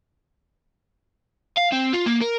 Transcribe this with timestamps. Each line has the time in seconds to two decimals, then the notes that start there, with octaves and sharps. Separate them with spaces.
1.57 F5
1.72 C4
1.93 F4
2.06 A#3
2.21 A#4